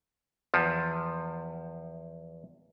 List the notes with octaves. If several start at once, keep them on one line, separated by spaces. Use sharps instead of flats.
E2 F3